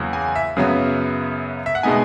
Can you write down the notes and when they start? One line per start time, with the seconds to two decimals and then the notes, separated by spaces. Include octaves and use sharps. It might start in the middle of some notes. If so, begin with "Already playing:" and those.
Already playing: E2 C#3 F#3 A#3
0.13 G#5
0.35 E5
0.57 F#2 C#3 F#3 B3
1.66 E5
1.75 F#5
1.83 B2 G#3 B3 D#4 G#5